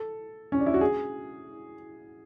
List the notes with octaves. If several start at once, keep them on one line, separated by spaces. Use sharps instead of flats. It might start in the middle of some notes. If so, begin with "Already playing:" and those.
Already playing: A4
C#4
D4
E4
F#4
G#4